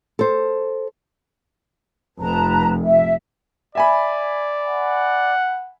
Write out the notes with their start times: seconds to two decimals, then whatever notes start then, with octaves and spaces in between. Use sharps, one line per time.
0.19 A4 C5
2.19 F1 B4 A5 A#5
2.83 E5
3.75 D5 E5 G#5 B5
4.67 F#5